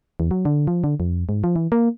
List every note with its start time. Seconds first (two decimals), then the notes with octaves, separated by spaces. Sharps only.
0.20 E2
0.31 F#3
0.45 D3
0.67 F3
0.84 D3
1.00 F2
1.29 G#2
1.44 F3
1.56 E3
1.72 A#3